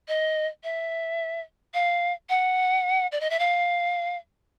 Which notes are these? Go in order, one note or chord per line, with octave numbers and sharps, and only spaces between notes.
D#5
E5
F5
F#5
D5
D#5
E5
F5